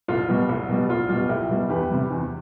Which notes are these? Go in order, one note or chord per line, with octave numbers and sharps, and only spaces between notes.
C2 F4
B2 G3
C2
B2 G3
C2 F4
B2 G3 F4
C2 E4 G4
B2 G3
E2 G4 B4
C3 G3
E2